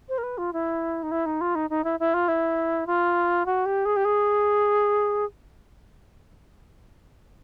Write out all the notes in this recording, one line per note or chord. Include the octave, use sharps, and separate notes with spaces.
C5
A#4
B4
F4
E4
D#4
E4
D#4
F4
D#4
D#4
E4
E4
F4
E4
F4
F#4
G4
G#4
G4
G#4